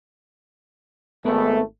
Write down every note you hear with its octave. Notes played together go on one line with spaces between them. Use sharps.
G#1 A3 B3 A#4 B4